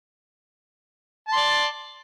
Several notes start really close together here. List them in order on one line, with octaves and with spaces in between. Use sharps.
A5 C6 D5